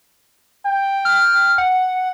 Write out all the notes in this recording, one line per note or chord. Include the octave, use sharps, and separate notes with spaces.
G5
F6
F#5